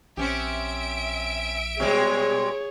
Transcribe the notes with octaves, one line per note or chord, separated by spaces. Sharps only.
A#1 C4 C#4 G4 E5 D7
B2 G3 G#3 G#4 C#5